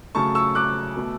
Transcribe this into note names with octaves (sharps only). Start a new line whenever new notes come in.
C#3 F#3 A3 A5 C#6
C#6 E6
D6 F#6
B2 A3